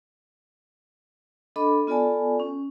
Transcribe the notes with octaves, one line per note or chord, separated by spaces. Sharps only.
D4 A4 D#5 B5 D6
B3 F4 A4 D5 G#5 A5
C#4